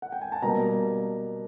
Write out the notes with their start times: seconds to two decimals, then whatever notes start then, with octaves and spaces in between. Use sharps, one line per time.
0.02 F#5
0.12 G5
0.22 G#5
0.32 A5
0.42 B2 G3 A#3 A#5